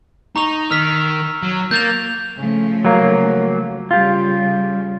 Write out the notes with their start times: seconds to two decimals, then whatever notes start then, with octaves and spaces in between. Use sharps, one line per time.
0.36 D#4 A#5 C#6 F7
0.71 D#3 E6 F6 B6
1.43 F#3
1.71 A#3 G6 A6 F7
2.37 C#3 F3 A3
2.85 F#3 A#3
3.91 C#3 G3 F4 G4